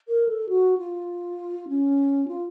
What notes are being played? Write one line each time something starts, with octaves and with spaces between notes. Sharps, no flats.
A#4
A4
F#4
F4
C#4
F4